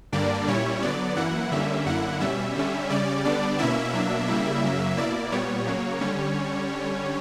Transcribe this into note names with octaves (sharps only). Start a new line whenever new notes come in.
G2 D3 G3 A#3 D4 D5
A#2 G3 C#4 E4 C#5
D3 F#3 B3 D5
F#2 E3 A#3 E4 F#5
D3 G3 A#3 C#4 E5
F#2 D3 A#3 E4 F#5
B2 G3 C#4 E5
D3 G3 C#4
C#3 G3 C#4 D5
D3 G3 B3 D4 D5
B2 A#3 C#4 E4 E5
B2 F#3 A#3 D4
C#3 G3 A#3 E4
F#2 C#3 F#3 A#3
B2 A#3 E4 D5
A#2 G3 B3 C#5
C#3 F#3 A#3
D3 G3 C#4